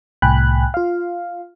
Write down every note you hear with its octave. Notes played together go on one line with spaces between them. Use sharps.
C2 A2 G5 G#5 B5 F#6
F4 F5